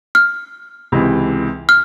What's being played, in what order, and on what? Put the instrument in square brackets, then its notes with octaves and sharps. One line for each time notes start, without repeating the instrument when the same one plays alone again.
[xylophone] F6
[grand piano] C#2 C3 E3
[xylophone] F6